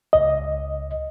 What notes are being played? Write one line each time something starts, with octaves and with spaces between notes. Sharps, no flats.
C#2 D#5